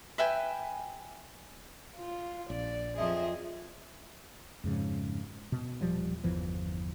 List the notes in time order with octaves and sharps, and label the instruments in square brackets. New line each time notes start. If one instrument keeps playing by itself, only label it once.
[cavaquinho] B4 E5 G5 G#5
[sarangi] F4
[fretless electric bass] A#1 [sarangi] D5
[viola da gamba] F2 F3 D#5 [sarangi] G#4 [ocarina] E5
[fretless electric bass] F2 G#2 C#3
B2
D#1 F3 G3
G1 E2 E3 F3